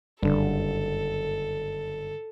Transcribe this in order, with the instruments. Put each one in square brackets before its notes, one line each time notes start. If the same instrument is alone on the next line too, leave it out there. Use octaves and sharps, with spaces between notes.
[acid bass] F#1 [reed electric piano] G2 D3 [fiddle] A4